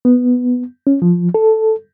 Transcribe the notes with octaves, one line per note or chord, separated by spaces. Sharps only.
B3
C#4
F3
A4